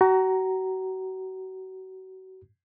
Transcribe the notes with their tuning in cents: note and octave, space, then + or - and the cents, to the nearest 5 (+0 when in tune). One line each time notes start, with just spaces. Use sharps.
F#4 +30 A#5 +0